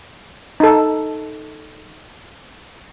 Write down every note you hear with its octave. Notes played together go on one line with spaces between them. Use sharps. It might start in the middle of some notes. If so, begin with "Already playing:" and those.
D#4 A4